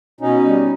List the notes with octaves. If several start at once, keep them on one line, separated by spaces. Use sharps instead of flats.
B2 C#4 D#4
G3